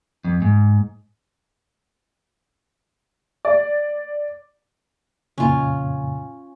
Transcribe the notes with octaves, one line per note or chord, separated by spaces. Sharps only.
F2
G#2
D5
F2 A#2 C#3 C#4 F4